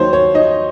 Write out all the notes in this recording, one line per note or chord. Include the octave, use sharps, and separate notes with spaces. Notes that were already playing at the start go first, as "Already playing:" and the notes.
Already playing: D#2 D#3 F#3 D#4 C5 C#5
C#5
D#4 D#5